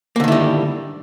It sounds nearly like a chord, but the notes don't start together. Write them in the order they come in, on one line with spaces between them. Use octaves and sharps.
A#3 D3 D#3 E4 G3